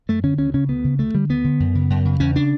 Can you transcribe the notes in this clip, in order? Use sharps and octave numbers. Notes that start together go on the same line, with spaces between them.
F#2 A3
D3 C#4
D2 C#4
C#3 C#4
D2 B3
C#3
D2 A3
D3 G3
D2 B3
D3
F#2
C#3
F#2
C#3
E2 C#4
C#3 D4